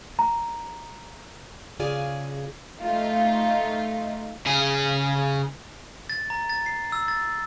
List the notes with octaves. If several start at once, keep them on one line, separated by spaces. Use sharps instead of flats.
A#5
C#3 F4 G#4 D5 G#5
A3 D#4 F4
C#3 G#4
A6
A#5
A6
C7
E6
A6